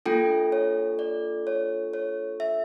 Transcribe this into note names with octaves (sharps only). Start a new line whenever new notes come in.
A#3 D4 F4 A4 G5
C#5
D5
C#5
C#5
E5